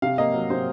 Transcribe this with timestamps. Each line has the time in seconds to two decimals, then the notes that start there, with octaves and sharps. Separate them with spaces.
0.02 C3 F5
0.18 A#3 D#5
0.34 F#3
0.50 C3 C5